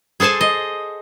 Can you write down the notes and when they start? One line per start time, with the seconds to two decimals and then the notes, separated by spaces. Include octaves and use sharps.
0.20 G#4 A4 C5 G#5 A5
0.41 D#5